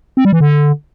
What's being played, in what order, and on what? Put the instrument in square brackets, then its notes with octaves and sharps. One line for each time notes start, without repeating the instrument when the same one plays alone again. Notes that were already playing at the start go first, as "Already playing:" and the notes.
[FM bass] C4
G3
E3
D3